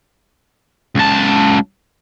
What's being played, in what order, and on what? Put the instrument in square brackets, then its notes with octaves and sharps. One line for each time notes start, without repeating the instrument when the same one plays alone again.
[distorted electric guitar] C#2 A5